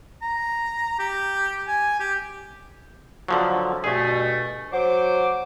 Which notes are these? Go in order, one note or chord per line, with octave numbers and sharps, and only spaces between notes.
A#5
G4
G#5
G4
D3 F3 F#3
G2 B2 A3 G#4
F#3 C5 D6